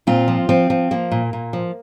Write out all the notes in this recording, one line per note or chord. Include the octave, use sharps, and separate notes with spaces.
A#2 C4 F4
F3
F3 C4
F3
F3 A#3
A#2
A#2
F3